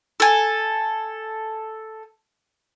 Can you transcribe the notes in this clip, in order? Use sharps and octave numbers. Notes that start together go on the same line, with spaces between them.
A4 G#5